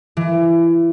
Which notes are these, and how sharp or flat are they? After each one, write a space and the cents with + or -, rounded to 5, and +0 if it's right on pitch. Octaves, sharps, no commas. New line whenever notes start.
E3 +25